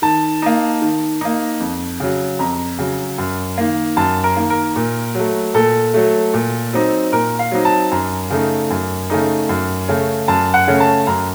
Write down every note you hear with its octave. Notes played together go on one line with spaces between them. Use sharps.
D#3 A5
A#3 D#4
D#3
A#3 D#4
F2
C#3 F#3
F2 A#5
C#3 F#3
F#2
D#3 A#3
F#2 A5
A#4
D#3 A#3
A#4
A#2
F#3 A3
A#2 A4
F#3 A3
A#2
F#3 C4 D#4
A#2 A#4
F5
F#3 C4 D#4
A5
F#2 A#5
C#3 A3 D#4
F#2
C#3 A3 D#4
F#2
C#3 A3 C#4
F#2 A5
F#5
C#3 A3 C#4
A5
F#2 A#5